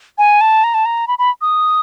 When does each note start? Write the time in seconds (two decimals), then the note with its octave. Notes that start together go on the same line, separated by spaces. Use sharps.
0.18 G#5
0.41 A5
0.64 A#5
0.74 A5
0.85 A#5
1.08 B5
1.18 B5
1.41 D#6